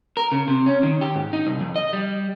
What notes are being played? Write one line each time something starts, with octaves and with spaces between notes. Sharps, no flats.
A#4
C#3
C3
C#4
D#3
G4
G#2
D#4
C2
F2
D#5
G3